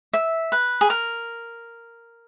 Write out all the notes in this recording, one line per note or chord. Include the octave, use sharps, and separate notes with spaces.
E5
B4
G#4
A#4